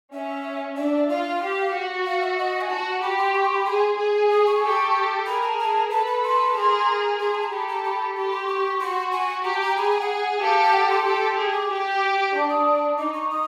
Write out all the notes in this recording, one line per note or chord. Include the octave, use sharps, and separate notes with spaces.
C#4 E5
D4 E5
F4 F5
G4
F#4
F5
E5
D#5
G#5
F#4 A5
G4 B5
C6
C#6
C6
B5
G#4 C6
G#4
D#6
C#6
G4 A4
G#4 A#4 B5
A5
A5
A4 B4 A5
B5
C6
G#4 A#4
G#4 C6
A5
A#5
G4 A4 B5
A#5
B5
G4 B5
C6
C#6
F#4 C6
G#5
G4 A#5
A5
A#5
G#4 B5
A#5
G5
F#5
G4 A4 F5
F5
F#5
C6
G4 A4
G#4
D6
G4
D4 D6
D#6
D#4 D6
C#6
D#6